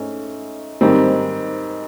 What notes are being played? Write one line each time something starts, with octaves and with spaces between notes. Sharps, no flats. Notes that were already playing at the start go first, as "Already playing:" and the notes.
Already playing: G#2 A3 C#4
G#2 D#3 G3 C4